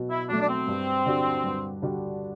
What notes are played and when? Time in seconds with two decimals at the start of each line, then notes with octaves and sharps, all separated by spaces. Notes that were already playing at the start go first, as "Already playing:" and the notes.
Already playing: B2 F#3
0.10 E4
0.29 F#3 A3 D4
0.41 D4
0.48 C4
0.67 G2
1.06 D3 G3 D4 F#4
1.44 G2
1.82 D3 G3 D4 F#4